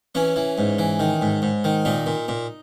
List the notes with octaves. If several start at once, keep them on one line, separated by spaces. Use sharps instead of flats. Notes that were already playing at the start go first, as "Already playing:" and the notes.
E3 C#4
E3
G#2
E3
D#3
G#2
G#2
D#3
A#2 D#4
A#2
A#2